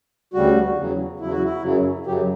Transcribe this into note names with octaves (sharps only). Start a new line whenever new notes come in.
D2 C#3 G3 F#4
E2 C#3 F#3
E2 C#3 F#3 E4
F#4
E4
F#2 C#3 F#3
F#2 C#3 F#3 G4